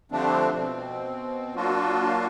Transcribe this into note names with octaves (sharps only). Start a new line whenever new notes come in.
D3 F3 G3 A3 C4 D4
B2 C4
F#3 A#3 D4 F4 F#4